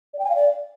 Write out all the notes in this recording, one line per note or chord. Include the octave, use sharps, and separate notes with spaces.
D5
G5
G#5
F5
D5